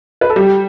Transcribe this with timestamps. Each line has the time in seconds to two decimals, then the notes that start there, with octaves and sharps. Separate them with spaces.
0.21 B4
0.30 A4
0.36 G3 G4